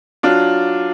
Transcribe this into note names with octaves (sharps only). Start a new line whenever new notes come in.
F#3 D4 F4